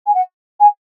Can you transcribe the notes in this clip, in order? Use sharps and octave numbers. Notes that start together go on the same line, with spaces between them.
G#5
F#5
G#5